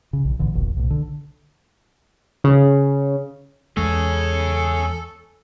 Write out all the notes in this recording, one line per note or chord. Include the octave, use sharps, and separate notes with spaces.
C#3
A#1
A1 D3 E3
E1 A#1
B1 A2
D3
C#3
E2 G#3 G#4 A4 C#5